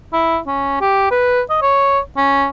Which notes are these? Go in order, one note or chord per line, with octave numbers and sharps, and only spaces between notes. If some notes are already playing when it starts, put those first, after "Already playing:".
E4
C#4
G4
B4
D#5
C#5
C#4